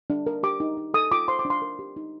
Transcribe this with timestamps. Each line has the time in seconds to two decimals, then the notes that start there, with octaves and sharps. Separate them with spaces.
0.10 D4
0.27 A#4
0.43 G4 D6
0.60 D#4
0.77 D#4
0.94 A4 D#6
1.11 F4 D6
1.28 C5 C6
1.39 D6
1.45 D4
1.50 C6
1.62 A#4
1.79 G4
1.96 D#4